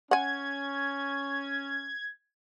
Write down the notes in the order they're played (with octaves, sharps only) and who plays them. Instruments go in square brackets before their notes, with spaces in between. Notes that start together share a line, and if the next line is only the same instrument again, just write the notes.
[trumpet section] C#4 [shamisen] F#5 G#5 [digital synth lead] G#6